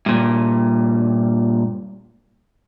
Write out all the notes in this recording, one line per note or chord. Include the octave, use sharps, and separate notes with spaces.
G2 A#2